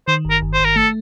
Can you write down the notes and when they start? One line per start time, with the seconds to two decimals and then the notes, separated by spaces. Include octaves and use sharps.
0.08 D#3 C5
0.25 G1
0.30 A#4
0.42 G1
0.54 C5
0.60 G1
0.65 A#4
0.76 A3 A4